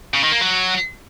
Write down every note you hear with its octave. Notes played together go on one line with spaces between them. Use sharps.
C#3
D#3
A#3
F#3